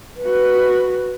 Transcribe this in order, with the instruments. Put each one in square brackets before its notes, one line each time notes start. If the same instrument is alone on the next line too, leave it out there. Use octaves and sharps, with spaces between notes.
[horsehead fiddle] F#4 B4